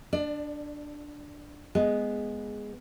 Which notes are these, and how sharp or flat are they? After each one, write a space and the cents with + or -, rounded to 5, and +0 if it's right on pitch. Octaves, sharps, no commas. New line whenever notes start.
D4 +0 D5 +30
G#3 +0 B3 +0